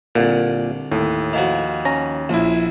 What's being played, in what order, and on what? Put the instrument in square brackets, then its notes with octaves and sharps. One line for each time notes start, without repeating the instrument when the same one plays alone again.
[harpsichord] C2 D3 [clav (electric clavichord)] A#2
[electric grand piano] D#2 [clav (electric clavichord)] A2
[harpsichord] D#3 F3 F#4
[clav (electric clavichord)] C#4 A#5
[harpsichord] A#1 [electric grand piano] F3 E4